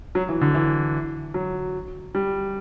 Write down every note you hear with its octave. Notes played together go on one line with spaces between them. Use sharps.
F#3
E3
D3
E3
F#3
G3